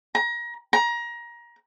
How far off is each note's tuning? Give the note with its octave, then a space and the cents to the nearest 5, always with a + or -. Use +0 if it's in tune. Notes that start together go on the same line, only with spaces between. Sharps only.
A#5 +30
A#5 +25